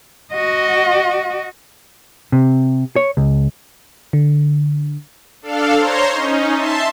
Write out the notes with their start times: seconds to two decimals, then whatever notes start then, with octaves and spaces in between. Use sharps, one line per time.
0.32 F#4 D#5
2.32 C3
2.96 C#5
3.17 C#2
4.13 D3
5.42 D4 A4 F5
5.76 C5 C#5 A#5 C6
6.10 C#4 D#4
6.55 E5 A5 C6